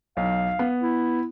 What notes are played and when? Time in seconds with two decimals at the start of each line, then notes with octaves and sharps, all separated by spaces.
0.17 B1 F5
0.59 B3
0.82 E4